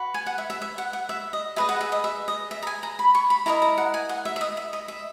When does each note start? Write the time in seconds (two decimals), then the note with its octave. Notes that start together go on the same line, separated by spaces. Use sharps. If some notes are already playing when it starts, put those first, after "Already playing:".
Already playing: F#4 B4
0.14 G#5
0.26 F#5
0.38 E5
0.50 E5
0.62 E5
0.78 F#5
0.93 F#5
1.09 E5
1.33 D#5
1.56 G#4 B4 D#5 E5
1.69 F#5
1.81 E5
1.92 D#5
2.04 E5
2.28 D#5
2.51 E5
2.63 A#5
2.67 G#5
2.83 A#5
2.99 B5
3.15 C#6
3.30 B5
3.46 E4 A#4 D#5 A#5
3.62 A#5
3.78 F#5
3.94 G#5
4.09 F#5
4.25 E5
4.36 E5
4.41 D#5
4.57 E5
4.73 D#5
4.88 E5